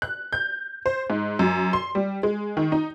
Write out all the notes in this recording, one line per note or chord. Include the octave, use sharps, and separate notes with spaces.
F#6
G6
C5
G#2
F#2
C6
G3
G#3
D#3
D#4